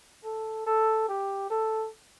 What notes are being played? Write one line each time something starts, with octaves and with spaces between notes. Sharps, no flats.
A4
A4
G4
A4